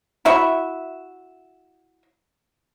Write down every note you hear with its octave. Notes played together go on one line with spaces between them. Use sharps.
E4 F#4 E5